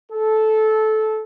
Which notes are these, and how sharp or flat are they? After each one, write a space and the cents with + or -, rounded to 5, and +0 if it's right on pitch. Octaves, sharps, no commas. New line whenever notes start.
A4 -15